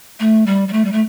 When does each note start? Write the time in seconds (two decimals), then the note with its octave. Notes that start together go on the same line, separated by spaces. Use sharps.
0.20 A3
0.47 G3
0.68 G3
0.73 A3
0.85 G3
0.92 A3